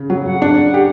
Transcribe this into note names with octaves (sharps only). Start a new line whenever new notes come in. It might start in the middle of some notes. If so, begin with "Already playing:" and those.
Already playing: C#3
F#3
F#5
D4
G4